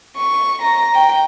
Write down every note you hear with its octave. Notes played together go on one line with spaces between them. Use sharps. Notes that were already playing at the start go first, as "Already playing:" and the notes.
C#6
A#5
G5